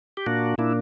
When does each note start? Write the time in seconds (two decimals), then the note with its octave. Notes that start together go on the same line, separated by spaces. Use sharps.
0.17 G4
0.26 A#2 A#3 D4 F#4
0.58 A#2 A#3 D4 E4